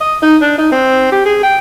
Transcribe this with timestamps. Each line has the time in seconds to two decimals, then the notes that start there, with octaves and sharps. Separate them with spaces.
0.01 D#5
0.23 D#4
0.42 D4
0.58 D#4
0.72 C4
1.12 G4
1.25 G#4
1.43 G5